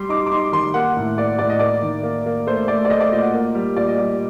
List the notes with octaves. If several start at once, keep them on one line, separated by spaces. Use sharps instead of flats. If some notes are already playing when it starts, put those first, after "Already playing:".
Already playing: G3 C6
D#4 D6
D6
D#4 C6
D#3 C6
A#3 F#5
A2
A#3 D5
A2 D5
D#5
A#3 D5
D#3
A#3
A#3
A3 C5
A3 D5
D5
A3 D#5
D5
A#2 D#5
F#5
A#3
G3
A#2 D5
D#5
G3 D5